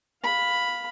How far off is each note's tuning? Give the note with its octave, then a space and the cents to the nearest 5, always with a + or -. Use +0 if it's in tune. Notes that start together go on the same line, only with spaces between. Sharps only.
F5 +10 B5 +0